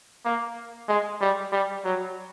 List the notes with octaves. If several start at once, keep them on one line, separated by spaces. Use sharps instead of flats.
A#3
G#3
G3
G3
F#3